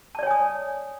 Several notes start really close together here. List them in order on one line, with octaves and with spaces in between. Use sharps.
A5 D5 C#5 G#5 D#6